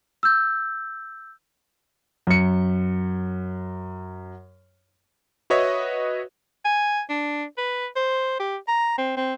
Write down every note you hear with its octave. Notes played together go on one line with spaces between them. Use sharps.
E6 G6
F#2 C#7
F#4 B4 C#5 D#5 E5
G#5
D4
B4
C5
G4
A#5
C4
C4